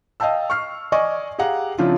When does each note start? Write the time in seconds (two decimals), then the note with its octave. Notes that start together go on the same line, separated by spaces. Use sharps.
0.20 D#5 F5 G5 A5 E6
0.50 C#6 F6 C7
0.92 D5 D#5 G#5 C#6
1.39 G4 G#4 F5 F#5 A#5
1.78 C#3 F3 C4 D4 E4 F4